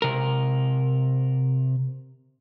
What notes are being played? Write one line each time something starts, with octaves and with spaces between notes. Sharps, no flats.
C3 A#4